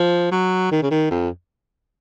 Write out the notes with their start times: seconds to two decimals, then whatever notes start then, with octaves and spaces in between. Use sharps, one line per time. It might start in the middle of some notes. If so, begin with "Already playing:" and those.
Already playing: F3
0.32 F#3
0.72 D#3
0.82 C#3
0.91 D#3
1.11 F2